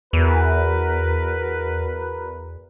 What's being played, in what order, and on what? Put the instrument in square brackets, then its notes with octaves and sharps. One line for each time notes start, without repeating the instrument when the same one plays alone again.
[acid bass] E2 [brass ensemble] F#4 A#4 B4